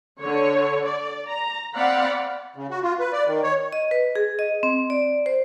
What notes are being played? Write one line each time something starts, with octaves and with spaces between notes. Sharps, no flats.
D3 C#5
D5
A#5
C4 D5 F5 F#5 B5
C#3
F#4
F4
B4
D5
D#3
C#5
D#5
B4
G#4
D#5
C4
D5
C5